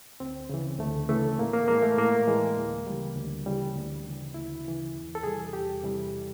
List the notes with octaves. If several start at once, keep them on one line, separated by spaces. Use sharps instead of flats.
D2 C4
C#3 E3
D2 A3
C#3 E3 A3
A2 A#3
A#3
E3 G#3 A#3
A3
A2 A#3
E3 G#3
D2
C#3 E3 G3
D2
C#3 E3 G3
D2
C#3 E3
D2 E4
C#3 E3
E2
A4
C3 E3 G3 G#4
E2 G4
C3 E3 G3